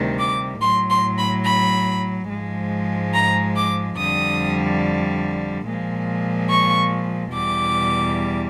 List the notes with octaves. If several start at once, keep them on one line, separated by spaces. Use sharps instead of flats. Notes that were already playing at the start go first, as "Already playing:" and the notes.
Already playing: D2 C3 D#3 G3
D6
A2 F#3 C6
C6
B5
B5
G#2 F3 G#3
A#5
D6
F2 D3 G3 D#6
A#2 F3 G#3
C#6
E2 B2 G3 D6